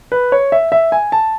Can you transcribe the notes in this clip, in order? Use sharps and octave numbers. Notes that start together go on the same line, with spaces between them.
B4
C#5
E5
E5
G#5
A5